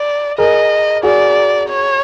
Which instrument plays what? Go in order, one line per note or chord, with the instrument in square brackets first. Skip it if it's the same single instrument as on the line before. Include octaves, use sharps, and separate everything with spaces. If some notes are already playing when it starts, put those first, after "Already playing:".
Already playing: [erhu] D5
[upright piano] G#4 A#4 [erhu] D#5
[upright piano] F#4 G#4 [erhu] D5
[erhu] C#5